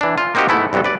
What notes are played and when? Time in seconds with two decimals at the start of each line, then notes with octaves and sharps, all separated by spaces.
0.01 E3 D4
0.18 F4
0.35 A#3 C4 D#4 F#4 G4
0.48 G#2 A3 B3 E4
0.73 C2 G2 F#3 B3 A4
0.84 B4 D5